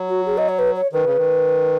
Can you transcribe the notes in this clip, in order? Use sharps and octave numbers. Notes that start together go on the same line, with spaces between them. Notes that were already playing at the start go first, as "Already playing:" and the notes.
Already playing: F#3
F#4
G#4
D#5
C#5
B4
C#5
D#3 B4
C#3
D#3